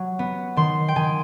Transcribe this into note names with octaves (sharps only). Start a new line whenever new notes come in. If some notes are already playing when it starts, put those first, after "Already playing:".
Already playing: F#3
B3
D#3 C6
G5
D#3 G#5